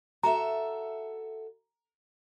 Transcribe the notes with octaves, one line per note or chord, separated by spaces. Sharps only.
F#4 A4 E5 A#5